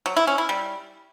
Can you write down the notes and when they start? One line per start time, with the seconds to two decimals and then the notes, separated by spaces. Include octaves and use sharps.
0.06 F#3
0.17 E4
0.27 C#4
0.38 E4
0.49 G3